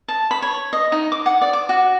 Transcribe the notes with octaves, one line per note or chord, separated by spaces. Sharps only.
A5
B5
C#5
D#5
D#4
D6
F#5
D5
D6
F#4